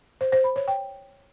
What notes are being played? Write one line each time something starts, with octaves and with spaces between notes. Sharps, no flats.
C5
C5
B5
C#5
G5